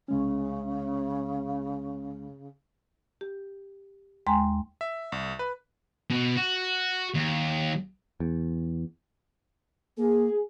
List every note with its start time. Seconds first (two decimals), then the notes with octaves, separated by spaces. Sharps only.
0.08 C2 C#3 G#3 C#4
3.21 G4
4.27 D#2 G#3 G5 G#5 A#5 C6
4.81 E5
5.12 C2
5.39 B4
6.10 B2
6.37 F#4
7.14 D#2
8.20 E2
9.97 A#3 G#4